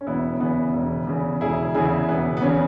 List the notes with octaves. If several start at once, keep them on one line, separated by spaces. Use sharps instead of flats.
C#4
E1 B3 E4
E2 C#3 B3 E4
E1
E2 C#3
E1 E4 G#4
E2 C#3 E4 G#4
E1 B3
B3
E2 C#3 C#4